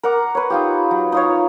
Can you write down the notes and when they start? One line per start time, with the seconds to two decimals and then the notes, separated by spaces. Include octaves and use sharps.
0.03 A#4 F#5 D6
0.35 B4 C#5
0.50 D#4 F4 G4
0.91 F#3
1.12 D#4 F4 C#5